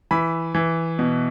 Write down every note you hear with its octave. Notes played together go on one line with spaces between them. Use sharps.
E3 B5
E3
B2